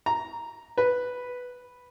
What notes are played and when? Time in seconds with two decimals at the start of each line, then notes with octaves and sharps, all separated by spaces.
0.06 A#5
0.78 B4